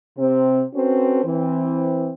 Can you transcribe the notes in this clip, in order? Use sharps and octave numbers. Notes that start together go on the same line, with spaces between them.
C3 C4
C4 C#4 F#4 A4 B4 C5
E3 C4